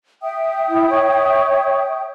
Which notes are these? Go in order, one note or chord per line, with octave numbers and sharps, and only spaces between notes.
E5 G5 D#6
E4
C#5